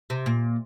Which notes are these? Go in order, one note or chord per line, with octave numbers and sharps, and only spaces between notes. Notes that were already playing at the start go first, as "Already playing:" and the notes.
C3
A#2